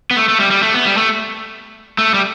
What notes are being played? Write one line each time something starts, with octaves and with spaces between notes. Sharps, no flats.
B3
A3
A3
G3
G3
A3
B3
G3
A3
A3
G3